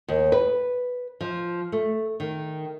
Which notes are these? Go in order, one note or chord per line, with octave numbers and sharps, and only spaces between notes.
D#2
B4
F3
A3
D#3